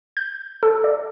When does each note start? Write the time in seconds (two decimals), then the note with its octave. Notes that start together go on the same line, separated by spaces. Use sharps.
0.17 G6
0.63 A4
0.84 D5